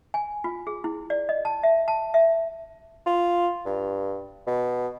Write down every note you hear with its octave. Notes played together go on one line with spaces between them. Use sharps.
G#5
F4
G#4
E4
D5
D#5
A5
E5
A5
E5
F4
G2
B2